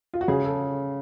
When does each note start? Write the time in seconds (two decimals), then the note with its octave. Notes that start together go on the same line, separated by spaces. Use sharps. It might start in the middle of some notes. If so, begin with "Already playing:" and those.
0.14 F4
0.21 F#4
0.28 C#3 G#4
0.45 A4